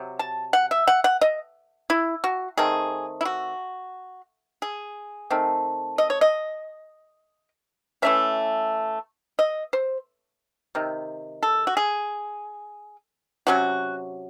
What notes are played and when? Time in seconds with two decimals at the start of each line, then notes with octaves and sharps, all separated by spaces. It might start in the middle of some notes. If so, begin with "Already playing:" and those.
Already playing: C3 F#3
0.19 A5
0.53 F#5
0.71 E5
0.87 F#5
1.04 F#5
1.21 D#5
1.90 E4
2.24 F#4
2.57 D#3 A3 C4 G#4
3.21 E4
3.25 F#4
4.62 G#4
5.30 D#3 A3 C4
5.98 D#5
6.10 C#5
6.21 D#5
8.02 E3 A3 C#4 E5
9.39 D#5
9.73 C5
10.75 C3 D#3
11.43 A4
11.67 F#4
11.77 G#4
13.47 C3 F#3 C#4 F#4